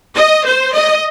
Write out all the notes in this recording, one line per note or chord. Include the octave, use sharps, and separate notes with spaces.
D#5
C5
D#5